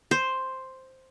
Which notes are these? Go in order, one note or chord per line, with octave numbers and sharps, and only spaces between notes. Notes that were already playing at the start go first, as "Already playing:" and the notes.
C5